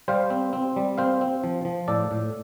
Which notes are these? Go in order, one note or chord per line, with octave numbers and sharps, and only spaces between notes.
G3 C5 F5
C4
C4
G3
C4 C5 F5
C4
F3
F3
A2 A4 D5
A2